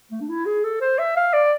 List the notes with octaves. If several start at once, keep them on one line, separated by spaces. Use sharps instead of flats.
A3
D4
E4
G#4
A4
C5
E5
F5
D5